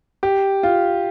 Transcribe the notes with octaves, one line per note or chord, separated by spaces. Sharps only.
G4
F4